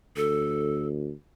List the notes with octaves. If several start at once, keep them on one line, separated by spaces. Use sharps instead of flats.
D2 A4